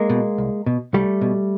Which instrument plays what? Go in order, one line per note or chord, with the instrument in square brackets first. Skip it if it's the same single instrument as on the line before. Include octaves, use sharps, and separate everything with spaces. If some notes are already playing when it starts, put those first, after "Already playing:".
Already playing: [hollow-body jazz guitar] G#3 A#3
B2
C2
B2
C2 G3 A3
B2